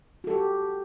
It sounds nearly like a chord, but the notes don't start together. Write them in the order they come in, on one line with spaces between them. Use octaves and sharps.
F#4 A4 G4